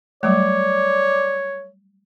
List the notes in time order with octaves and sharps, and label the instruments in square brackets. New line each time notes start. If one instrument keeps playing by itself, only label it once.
[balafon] F#3 G3 A3 [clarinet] C#5 [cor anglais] D5